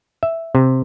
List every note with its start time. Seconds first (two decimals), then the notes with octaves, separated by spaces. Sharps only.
0.23 E5
0.55 C3